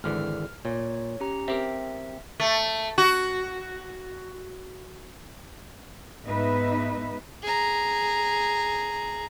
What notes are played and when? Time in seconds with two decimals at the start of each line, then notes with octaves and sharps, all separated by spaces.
0.04 G#1 D3 E3 F6
0.65 A#2 C#5
1.20 C#4 G4 A#5
1.48 C4 G4 A#4 E5
2.40 A3
2.98 F#4
6.27 G#2 B3 D#4 B4 E5
7.43 G#4 A#5